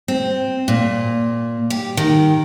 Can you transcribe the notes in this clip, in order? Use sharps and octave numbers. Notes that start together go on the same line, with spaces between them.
C4
A#2
G4
D#3